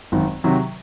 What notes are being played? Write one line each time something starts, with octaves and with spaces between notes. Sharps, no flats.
G#1 F#2 D#3
C3 D#3 F#3